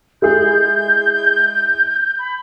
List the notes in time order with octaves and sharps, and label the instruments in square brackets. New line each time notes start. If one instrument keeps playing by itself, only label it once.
[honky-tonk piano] G#3 E4 G#4 [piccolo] G6
[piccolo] B5